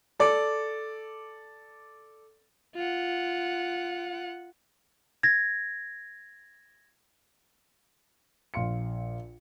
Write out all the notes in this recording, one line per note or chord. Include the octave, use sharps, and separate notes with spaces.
A4 D5 D6
F4 F#5
G#6 A#6
A#1 F5 C6 C#7